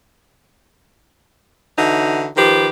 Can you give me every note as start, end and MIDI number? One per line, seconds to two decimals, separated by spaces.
1.77 2.28 50
1.77 2.28 52
1.77 2.28 63
1.77 2.28 66
2.36 2.68 51
2.36 2.68 53
2.36 2.68 67
2.36 2.68 71